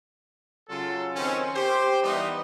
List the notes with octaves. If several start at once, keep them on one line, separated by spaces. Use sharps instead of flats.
C#3 F#3 F4 A4
D#3 C4 C#4
G4 C5
E3 G3 B3 D#4